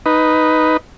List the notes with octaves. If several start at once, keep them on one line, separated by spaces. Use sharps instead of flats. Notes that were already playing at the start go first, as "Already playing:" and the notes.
D#4 B4